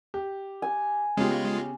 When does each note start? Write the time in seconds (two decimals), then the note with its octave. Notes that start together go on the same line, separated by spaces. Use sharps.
0.14 G4
0.62 G#5
1.17 C#3 G#3 B3 F4 G4